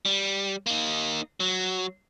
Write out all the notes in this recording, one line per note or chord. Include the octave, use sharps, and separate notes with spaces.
G3
A#3 D#4
F#3